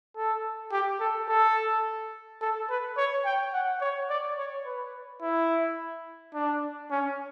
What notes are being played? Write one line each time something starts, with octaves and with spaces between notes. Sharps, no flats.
A4
G4
A4
A4
A4
B4
C#5
G5
F#5
C#5
D5
C#5
B4
E4
D4
C#4